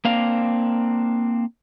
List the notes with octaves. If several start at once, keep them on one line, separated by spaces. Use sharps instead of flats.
A#3 C4 D4 F5